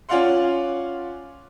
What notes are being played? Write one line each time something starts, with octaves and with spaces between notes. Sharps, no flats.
C#4 F4 D5 F5 F#5 C6